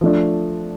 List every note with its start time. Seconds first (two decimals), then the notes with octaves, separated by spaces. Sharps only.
0.01 F3 A3 D4